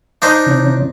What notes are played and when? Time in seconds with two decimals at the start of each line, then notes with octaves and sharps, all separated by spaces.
0.22 D4 D#4 C5
0.46 C3 E3 C#4